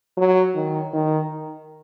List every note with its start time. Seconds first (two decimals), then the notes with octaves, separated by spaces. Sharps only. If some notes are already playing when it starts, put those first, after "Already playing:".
0.18 F#3
0.55 D#3
0.93 D#3